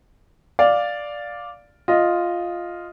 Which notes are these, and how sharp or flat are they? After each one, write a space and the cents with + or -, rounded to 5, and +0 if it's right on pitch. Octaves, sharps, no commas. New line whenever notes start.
D5 +0 F5 +5
F4 +0 D#5 +0